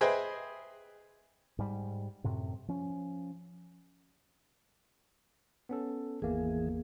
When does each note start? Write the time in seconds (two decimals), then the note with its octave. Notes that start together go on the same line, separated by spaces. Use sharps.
0.01 G#4 B4 C5 D#5 E5 G5
1.59 G#2 G3
2.24 F#2 A2 C3
2.68 F3 C#4
5.69 B3 C#4 A4
6.22 G#1 E2 E3 A#3 G#4